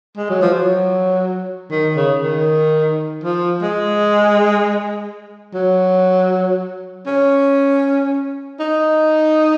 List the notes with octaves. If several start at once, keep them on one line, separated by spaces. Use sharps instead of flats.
G#3
F#3
F3
F#3
D#3
C#3
D#3
F3
G#3
F#3
C#4
D#4